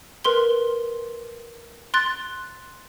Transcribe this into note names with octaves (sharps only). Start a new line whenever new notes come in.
A#4 B4 C6 G7
C6 F#6 A6